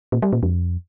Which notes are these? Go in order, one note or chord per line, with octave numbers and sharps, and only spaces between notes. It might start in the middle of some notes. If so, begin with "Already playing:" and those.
A#2
G3
A#2
F2